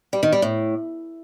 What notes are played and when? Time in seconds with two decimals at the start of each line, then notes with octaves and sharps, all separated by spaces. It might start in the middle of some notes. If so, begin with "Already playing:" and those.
0.13 G3
0.23 D#3
0.33 G3
0.42 A2